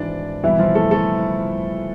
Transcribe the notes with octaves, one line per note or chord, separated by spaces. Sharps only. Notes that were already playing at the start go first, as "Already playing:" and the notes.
Already playing: G#1 G#2 E3 D4 D5
C2 B2 E3 E4
F3 F4
A3 A4
A3 A4